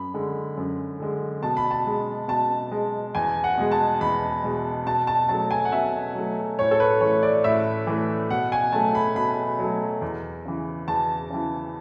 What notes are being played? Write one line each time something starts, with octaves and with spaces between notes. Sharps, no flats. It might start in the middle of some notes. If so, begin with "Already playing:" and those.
Already playing: F#2 B5
D3 G#3
F#2
D3 G#3
B2 A5
B5
A5
G#3
B2 A5
G#3
E2 G#5
F#5
B2 G#3
A5
E2 B5
B2 G#3
B2 A5
A5
F#3 A3 A5
G#5
F#5
B2 E5
F#3 A3
A2 C#5
A4
B4
E3 A3 C#5
D5
A2 E5
E3 A3
B2 F#5
G#5
F#3 A3 A5
B5
B2 B5
F#3 A3
E2
C#3 E3
E2 A5
C#3 E3